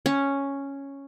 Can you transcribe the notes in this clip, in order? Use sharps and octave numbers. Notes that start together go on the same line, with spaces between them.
C#4